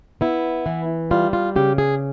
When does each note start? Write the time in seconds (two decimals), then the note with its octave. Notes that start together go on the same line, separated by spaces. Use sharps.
0.21 B3 E4
0.66 E3
1.11 G3 F4
1.33 F4
1.56 C#3 G4
1.78 G#4